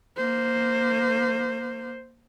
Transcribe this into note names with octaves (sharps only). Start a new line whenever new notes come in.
A#3 C5